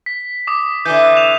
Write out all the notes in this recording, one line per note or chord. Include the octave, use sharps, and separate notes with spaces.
B6
D6 D#6 B6
D3 E3 G6
G6 E7 F7